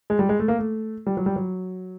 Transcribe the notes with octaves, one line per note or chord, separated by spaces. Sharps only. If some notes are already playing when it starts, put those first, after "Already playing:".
G#3
G3
G#3
A3
A#3
A3
G3
F#3
G3
F#3